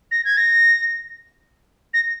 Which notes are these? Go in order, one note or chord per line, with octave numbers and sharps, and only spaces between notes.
A#6
G#6
A#6
A#6